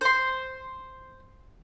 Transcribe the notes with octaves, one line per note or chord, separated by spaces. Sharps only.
C5 C6